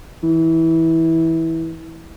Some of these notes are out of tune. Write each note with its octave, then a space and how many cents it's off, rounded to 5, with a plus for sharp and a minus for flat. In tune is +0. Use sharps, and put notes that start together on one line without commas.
E3 -20